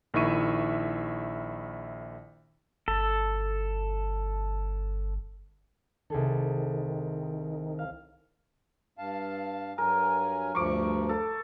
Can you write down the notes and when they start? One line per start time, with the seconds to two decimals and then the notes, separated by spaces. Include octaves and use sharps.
0.14 A#1 D#3 E4 E5 C#6 D#7
2.88 G1 A4
6.10 C2 D#3 G#4 A4
7.79 F5
8.98 G2 F5 A5
9.78 G2 F#3 A#4 G#5
10.55 D2 G2 F3 C#6 D6
11.09 A4